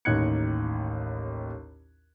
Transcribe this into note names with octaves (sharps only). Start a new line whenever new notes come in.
A1 D#2 D#4 F#6 G#6 C#7